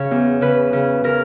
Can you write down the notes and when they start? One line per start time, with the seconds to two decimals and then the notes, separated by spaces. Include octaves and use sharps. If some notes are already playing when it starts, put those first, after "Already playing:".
Already playing: C#3 C#5
0.11 E2
0.41 C#3 B4
0.73 C#3
1.04 C#3 A#4